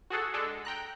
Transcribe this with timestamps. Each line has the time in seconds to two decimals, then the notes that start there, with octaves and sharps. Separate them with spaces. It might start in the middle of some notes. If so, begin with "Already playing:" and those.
0.10 F#4 G#4 A4 F#5
0.34 G#3 D4 A4
0.65 G5 A#5 F#6